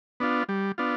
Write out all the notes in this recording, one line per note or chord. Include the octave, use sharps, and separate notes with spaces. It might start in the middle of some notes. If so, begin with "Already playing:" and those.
B3 D4 F4
G3
B3 D4 F4